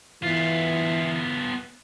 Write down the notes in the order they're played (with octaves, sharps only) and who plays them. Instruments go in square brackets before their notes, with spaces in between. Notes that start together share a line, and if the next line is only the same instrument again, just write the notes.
[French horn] E3 [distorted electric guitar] B3 F4